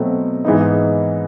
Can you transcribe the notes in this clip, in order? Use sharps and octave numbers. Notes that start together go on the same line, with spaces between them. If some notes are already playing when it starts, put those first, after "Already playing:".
Already playing: B2 F#3 A3 C4
G#2 E3 G#3 B3 D#4